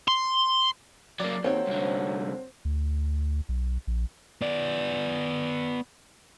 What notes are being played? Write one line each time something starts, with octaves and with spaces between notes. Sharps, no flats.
C6
F#3 A#3 D5
D#2 F#3 C4 A4 C#5 G5
C2 D3
D2
B1
A#1
B3 D5